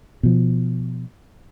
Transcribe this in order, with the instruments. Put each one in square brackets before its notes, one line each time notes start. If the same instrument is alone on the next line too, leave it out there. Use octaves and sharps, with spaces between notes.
[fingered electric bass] B2 F3